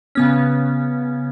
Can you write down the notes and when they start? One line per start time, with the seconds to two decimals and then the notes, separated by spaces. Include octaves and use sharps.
0.15 C#3 B3 C#4